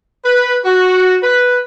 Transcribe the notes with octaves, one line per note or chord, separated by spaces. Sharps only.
B4
F#4
B4